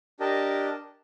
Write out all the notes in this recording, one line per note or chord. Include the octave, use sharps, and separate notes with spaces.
D4 G4 A#4 D#5 A5